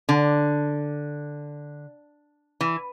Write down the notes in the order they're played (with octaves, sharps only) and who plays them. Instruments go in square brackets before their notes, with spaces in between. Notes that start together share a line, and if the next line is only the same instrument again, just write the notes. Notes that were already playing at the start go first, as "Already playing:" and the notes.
[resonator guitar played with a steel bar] D3
E3